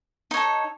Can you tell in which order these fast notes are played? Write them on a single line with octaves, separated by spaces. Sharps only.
D#4 C#5 A4